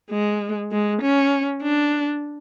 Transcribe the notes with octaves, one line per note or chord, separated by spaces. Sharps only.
G#3
G#3
C#4
D4